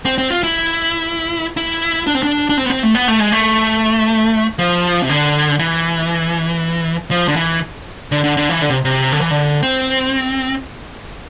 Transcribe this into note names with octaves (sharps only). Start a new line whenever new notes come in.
C4
C4
F4
E4
E4
D4
C4
D4
D4
C4
B3
C4
A3
B3
A3
G#3
A3
F3
C3
D3
E3
F3
D3
E3
D3
D3
D3
E3
D3
C3
C3
D3
E3
D3
C4